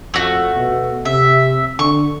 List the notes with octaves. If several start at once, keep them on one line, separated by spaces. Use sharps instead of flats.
F2 A3 F#4
B2
C3 E5
D3 C#6